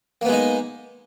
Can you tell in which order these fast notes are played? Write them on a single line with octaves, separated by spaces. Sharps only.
A#3 B3 G#3 D#4